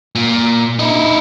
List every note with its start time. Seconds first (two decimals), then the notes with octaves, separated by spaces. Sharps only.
0.15 A#2
0.79 D#4 E4